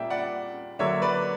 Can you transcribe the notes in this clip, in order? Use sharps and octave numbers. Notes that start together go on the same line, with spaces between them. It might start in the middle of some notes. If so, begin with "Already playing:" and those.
Already playing: A#2 G3 A#3 D5 E5 G5
D5 F#5
D3 F#3 A#3 C#5 E5
B4 D5